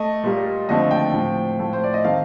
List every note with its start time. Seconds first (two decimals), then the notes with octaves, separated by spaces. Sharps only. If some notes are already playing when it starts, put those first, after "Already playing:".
Already playing: A3 D#5
0.23 A#2 G3 A#3
0.68 D#2 D3 F3 A3 C4 D#5
0.91 G5
1.13 A2 F3 C4
1.59 A2 F3 A3
1.73 C5
1.84 D5
1.94 D#5
2.04 D#3 A3 C4 F5